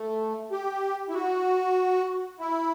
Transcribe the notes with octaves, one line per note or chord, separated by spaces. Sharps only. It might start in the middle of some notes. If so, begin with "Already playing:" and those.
Already playing: A3
G4
E4
F#4
E4